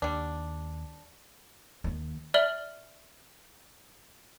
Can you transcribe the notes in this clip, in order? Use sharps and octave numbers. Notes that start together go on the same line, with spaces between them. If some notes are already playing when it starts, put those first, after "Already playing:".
D#2 G3 D4
D#2 D#3 A#3
D5 E5 F6 F#7 G7